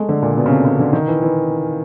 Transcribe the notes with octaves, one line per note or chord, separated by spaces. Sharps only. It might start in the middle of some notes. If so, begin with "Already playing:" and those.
Already playing: G#3 A3
D3
A#2
B2
C#3
C3
C#3
D3
D#3
E3
E3